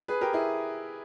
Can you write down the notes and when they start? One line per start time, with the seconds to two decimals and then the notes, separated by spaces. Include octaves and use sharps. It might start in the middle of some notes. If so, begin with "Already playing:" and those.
0.08 G#4 B4
0.21 G4 A#4
0.33 E4 G#4